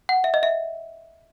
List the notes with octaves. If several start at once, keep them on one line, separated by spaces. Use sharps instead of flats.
F#5
E5
D#5
E5